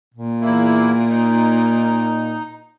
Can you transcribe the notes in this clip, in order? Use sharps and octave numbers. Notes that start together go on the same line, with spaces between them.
A#2
E2 A#3 E4
D#4